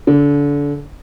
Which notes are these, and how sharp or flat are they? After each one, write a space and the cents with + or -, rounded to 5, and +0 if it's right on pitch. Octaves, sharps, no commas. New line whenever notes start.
D3 -30